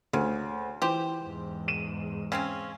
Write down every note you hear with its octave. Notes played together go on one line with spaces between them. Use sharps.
D2 C#3
E3 G4 C5
E2 G#2
D#7 E7
C#3 C4 C#4